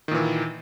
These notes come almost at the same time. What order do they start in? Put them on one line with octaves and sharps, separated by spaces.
D#3 A#2 E3